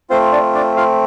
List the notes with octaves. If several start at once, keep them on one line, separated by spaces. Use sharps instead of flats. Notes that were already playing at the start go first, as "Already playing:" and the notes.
A3 C4 F4 C5
D4 D5
D4 D5
F4 F5